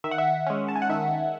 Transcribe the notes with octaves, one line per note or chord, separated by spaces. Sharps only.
D#3 E5
F#5
E5
G#3 C#4
A5
G#5
F#5
D#3 E5